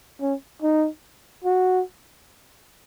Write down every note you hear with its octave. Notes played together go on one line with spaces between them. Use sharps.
C#4
D#4
F#4